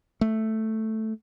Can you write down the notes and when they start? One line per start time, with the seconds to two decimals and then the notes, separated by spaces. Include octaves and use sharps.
0.21 A3